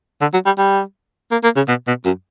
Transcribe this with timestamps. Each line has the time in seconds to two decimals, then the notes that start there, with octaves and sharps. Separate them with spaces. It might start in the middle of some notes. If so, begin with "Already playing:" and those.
0.21 D3
0.33 F#3
0.46 G3
0.58 G3
1.32 A#3
1.43 A#3
1.56 C#3
1.68 B2
1.87 B2
2.05 F#2